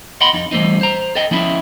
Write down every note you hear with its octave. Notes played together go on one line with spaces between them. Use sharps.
D#5 F#5 G5 B5 C6
F2 D#4
E3 G3 A3 C4 D#4
C5 A#5
A4 D#5 G5
F3 C#4 D#4 E4 E5